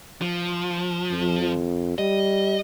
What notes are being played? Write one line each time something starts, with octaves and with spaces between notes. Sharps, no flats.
F3
F2
G3 D#5